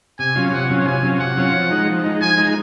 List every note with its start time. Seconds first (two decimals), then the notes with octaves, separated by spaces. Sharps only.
0.19 C3 G#5
0.35 F#3 C#4 F4
0.53 C3 F#5
0.69 F#3 C#4 F4
0.86 C3 G#5
1.03 F#3 C#4 F4
1.20 C3 F#5
1.36 F#3 C#4 F4
1.53 F3
1.70 G#3 D#4
1.87 F3
2.04 G#3 D#4
2.21 F3 G#5
2.37 G#3 D#4